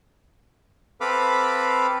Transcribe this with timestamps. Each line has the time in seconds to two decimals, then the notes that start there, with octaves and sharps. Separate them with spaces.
1.01 C4 A4 B4 F5 B5 D6